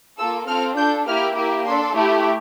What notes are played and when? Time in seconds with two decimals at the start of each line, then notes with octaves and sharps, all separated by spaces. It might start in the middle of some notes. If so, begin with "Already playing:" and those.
0.18 A#3 F4 A4 E6
0.47 C4 F4 A4 F6
0.77 D4 A4 G6
1.06 A#3 E4 G4 F6
1.36 A#3 E4 G4
1.65 D4 A4 C6
1.94 A3 E4 G4